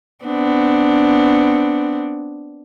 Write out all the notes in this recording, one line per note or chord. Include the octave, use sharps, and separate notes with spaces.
B3 C4 D4